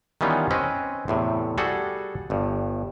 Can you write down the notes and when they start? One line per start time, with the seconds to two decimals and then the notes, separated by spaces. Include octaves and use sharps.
0.21 D#3 E3 G3 B3 C#4 F4
0.51 C4 C#4 B4 D#5
1.08 E2 A2 C3
1.58 G3 F#4 G#4 A4 F#5
2.30 G1 G2